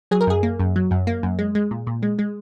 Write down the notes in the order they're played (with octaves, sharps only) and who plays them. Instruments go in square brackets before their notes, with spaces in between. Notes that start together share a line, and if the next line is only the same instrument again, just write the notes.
[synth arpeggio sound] F#3 G#4
A#4
F#2 G#4
A#3
F#2
F#3
F#2
A#3
F#2
G#3
G#3
A#2
A#2
G#3
G#3